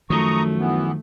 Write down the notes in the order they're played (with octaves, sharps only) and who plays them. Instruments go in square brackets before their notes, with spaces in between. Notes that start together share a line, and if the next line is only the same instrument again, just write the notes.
[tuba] F#2 [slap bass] D#3 F3 [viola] A3 [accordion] A#5 C#6 D#6
[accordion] E3 B3